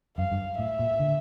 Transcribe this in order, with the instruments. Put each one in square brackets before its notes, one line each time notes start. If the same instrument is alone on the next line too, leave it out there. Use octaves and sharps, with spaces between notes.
[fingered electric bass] F#2 [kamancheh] F5
[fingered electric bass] G2
[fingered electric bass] A2 [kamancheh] E5
[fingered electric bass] A#2
D3